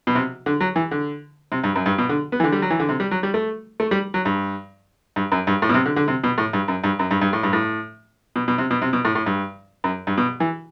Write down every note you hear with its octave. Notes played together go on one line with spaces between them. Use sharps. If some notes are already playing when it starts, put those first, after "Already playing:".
B2
C3
D3
F#3
E3
D3
C3
G2
F#2
G2
B2
D3
B3
E3
D3
G3
F#3
E3
D3
C3
G3
F#3
G3
A3
A3
G3
F#3
G2
G2
F#2
G2
A2
B2
C3
D3
D3
C3
B2
A2
G2
F#2
G2
F#2
G2
G2
A2
G2
A2
B2
B2
C3
B2
C3
B2
A2
A2
G2
F#2
G2
B2
E3